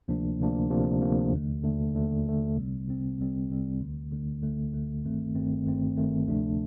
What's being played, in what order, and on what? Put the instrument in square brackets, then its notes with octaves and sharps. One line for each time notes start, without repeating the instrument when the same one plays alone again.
[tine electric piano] D2 C3 F3 A#3 D4
D2 C3 F3 A#3 D4
D2 C3 F3 A#3 D4
D2 C3 F3 A#3 D4
D#2 D3 A3
D#2 D3 A3
D#2 D3 A3
D#2 D3 A3
C2 C3 G3 C4
C2 C3 G3 C4
C2 C3 G3 C4
C2 C3 G3 C4
D2 D3 A3
D2 D3 A3
D2 D3 A3
D2 D3 A3
G1 G2 D#3 A3 C4
G1 G2 D#3 A3 C4
G1 G2 D#3 A3 C4
G1 G2 D#3 A3 C4
D2 C3 F3 A3 D4